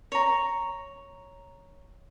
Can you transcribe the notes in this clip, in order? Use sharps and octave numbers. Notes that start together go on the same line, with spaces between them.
C#5 A#5